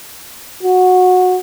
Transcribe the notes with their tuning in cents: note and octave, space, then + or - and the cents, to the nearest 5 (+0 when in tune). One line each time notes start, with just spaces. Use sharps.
F#4 -15